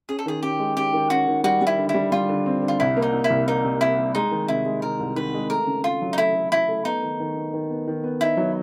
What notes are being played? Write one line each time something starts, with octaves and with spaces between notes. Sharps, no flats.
C#4 G#4
A4
D#3 G#4
C#4 G4
G#3
C#4 G4
D#3
C#4 F#4
D#3
G3 F#4
G3
E4
D3
E4
G3
G3 F4
D3
C4
D3
F4
C2 E4
A#3
D#4
C3
E4
C2
A#3 D#4
C3
C3 E4
C3
G#3 D#4
D#3
C3 E4
G#3
C3 A#4
C2
D#3 B4
G#3
A3 A#4
C#3
A3 F4
F#3
D#4
A3 E4
A3
F#3 E4
A3
B3 D#4
D#3
D#3
B3
D#3
B3
D#3
B3
D#4 E4
F#3